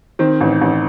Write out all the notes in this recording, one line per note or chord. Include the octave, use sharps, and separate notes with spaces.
D#3 C4
A1
A1